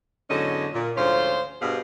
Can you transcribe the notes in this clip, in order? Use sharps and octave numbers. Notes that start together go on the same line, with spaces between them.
E2 G#2 D3 F#3 C#4 D#4
A#2
D2 G#2 F3 C#4 F4 C5
G2 B2 G4 G#4 C5 F5